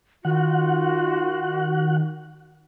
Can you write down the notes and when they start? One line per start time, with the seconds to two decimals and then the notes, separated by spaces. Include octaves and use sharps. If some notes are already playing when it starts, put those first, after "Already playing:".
0.25 D#3 F4 F#4 F#5